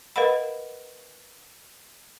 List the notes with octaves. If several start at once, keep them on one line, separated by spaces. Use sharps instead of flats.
A#4 B4 D#5 F5 F#5 B5